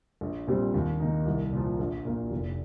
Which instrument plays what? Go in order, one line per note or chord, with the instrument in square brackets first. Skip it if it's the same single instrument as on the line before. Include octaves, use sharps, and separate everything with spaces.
[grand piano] A#1
A#2 G3 C4
D#2
D#3 A#3 D#4
C2
A#2 F3
A#1
A#2 A#3
F1